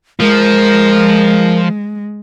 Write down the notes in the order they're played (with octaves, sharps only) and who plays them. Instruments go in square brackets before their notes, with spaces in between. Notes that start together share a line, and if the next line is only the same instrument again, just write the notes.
[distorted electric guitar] F3 [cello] G#3 [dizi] A#4